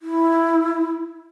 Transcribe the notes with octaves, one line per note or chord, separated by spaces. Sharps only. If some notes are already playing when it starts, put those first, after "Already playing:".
E4